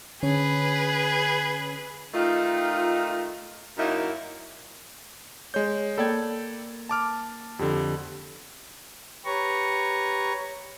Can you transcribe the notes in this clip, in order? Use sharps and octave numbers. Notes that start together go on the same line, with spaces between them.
D3 C#4 G#4 B4 C#5
D#3 A3 D#4 F4
F#2 F#3 A#3 D#4 E4
G#3 C#5 G6
A#3 A4 D5 G5 B5 G#6
A5 D6 F6
F2 D3 G4
G4 B4 C#5 A#5 C#6